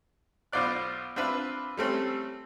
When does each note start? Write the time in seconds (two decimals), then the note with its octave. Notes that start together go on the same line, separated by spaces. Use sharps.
0.53 B1 B3 F4 C5 D5 F#6
1.16 C4 D4 F4 B4 E5
1.77 G3 A3 C4 C#4